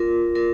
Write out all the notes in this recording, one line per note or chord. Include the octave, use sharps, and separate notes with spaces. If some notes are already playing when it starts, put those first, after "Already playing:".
Already playing: F4 A#4
A#4